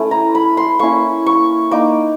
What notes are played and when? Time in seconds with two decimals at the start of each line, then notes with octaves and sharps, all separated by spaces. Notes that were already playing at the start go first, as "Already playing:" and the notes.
Already playing: A3 C#4 E4
0.11 A#5
0.35 B5
0.57 C6
0.79 A#3 C#4 E4 C#6
1.26 C#6
1.71 A#3 D#4 D6